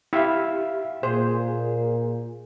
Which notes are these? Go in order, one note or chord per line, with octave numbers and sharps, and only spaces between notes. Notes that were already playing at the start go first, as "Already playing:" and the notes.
E4 G4 E5 F5
A#2 G#4 C5